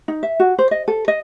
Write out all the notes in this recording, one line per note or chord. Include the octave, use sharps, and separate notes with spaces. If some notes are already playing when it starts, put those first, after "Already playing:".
D#4
E5
F#4
C5
D#5
A4
D#5